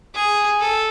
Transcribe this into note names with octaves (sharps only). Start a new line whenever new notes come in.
G#4
A4